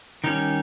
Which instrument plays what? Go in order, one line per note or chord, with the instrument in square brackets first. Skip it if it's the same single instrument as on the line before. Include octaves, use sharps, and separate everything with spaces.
[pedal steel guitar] D#3 G3 C#4 D#4